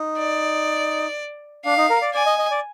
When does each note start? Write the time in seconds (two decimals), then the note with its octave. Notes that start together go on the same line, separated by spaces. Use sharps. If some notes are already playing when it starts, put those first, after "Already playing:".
Already playing: D#4
0.18 D5
1.65 D4 F5
1.78 D#4
1.90 A#4
2.02 D5
2.14 D5 G#5
2.26 D#5
2.38 D#5
2.51 D5